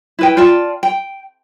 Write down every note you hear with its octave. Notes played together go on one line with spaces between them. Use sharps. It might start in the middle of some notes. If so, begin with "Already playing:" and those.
E4 B4 G5
F4 D5 G5 A5
G5